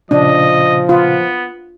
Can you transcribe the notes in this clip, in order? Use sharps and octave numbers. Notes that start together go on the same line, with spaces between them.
A#2 C#3 F3 D4 D#5
B3 F4